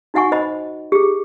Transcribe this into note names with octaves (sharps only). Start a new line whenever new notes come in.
D#4 F#4 E5 F#5 G#5 C#6
C5 D#5 B5
G4 G#4